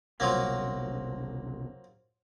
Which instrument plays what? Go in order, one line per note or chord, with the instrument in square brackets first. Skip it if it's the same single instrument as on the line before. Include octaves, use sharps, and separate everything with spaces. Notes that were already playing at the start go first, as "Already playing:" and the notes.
[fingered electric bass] F#1 C2 B2 [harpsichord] F3 F#3 A#3